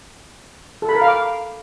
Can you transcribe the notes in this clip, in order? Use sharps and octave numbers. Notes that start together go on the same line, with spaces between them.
A4
B5
A#4
F5
D6